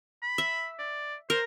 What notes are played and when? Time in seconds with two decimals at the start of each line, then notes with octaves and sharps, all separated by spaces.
0.22 B5
0.38 E5
0.79 D5
1.30 A#4 C5